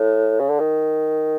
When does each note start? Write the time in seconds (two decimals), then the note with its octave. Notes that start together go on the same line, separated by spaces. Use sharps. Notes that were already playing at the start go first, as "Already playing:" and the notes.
Already playing: A2
0.40 C#3
0.50 D3
0.60 D#3